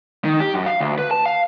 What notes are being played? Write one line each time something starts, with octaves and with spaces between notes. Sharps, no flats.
D#3
G4
F#2
F5
D2
B4
A5
F5